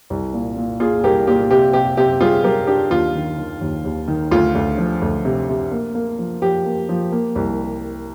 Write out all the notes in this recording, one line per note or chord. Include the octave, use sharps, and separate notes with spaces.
C2
A#2
A#2
A#2 F4 G#4
C2 G4 A#4
A#2 G4
C3 G4
C3 G4
C3 G4
G3 F4 G#4
G3 G4 A#4
D4 G4
D#2 F4
D#3
D#3
D#2
D#2
D#3
D2 F4
D2
F3
D2
C3
C3
A#3
A#3
F3
F3 G4
A#3
F3
A#3
C2